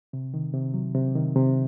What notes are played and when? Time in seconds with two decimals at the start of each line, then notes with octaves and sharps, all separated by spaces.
0.13 C3
0.34 D#3
0.54 C3
0.74 F#3
0.95 C3
1.15 D#3
1.36 C3